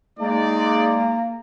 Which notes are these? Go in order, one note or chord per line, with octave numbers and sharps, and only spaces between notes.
G#3 A#3 D#4 D5